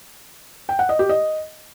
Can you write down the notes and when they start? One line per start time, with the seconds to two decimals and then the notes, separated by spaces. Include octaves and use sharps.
0.69 G5
0.79 F#5
0.89 D#5
0.99 G4
1.09 D#5